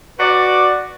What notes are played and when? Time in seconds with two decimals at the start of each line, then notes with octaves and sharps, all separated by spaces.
0.19 F#4 B4 D5